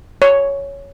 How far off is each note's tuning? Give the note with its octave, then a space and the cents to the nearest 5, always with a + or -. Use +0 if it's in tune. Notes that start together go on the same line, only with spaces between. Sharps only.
C#5 +5